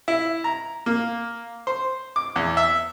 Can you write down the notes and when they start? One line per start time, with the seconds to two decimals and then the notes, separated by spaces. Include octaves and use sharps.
0.08 E4
0.44 A#5
0.86 A#3
1.67 C5
2.16 D6
2.36 E2
2.57 E5